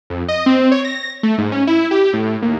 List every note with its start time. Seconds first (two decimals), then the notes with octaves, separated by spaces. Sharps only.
0.10 F2
0.28 D#5
0.46 C4
0.71 C#5
0.84 A#6
1.23 A3
1.38 G#2
1.52 C#4
1.67 E4
1.91 G4
2.13 A2
2.42 D#2